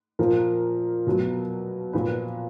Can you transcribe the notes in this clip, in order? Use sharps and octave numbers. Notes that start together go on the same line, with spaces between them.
A#2 F3 A#4
B2 F#3
A#2 F3 B4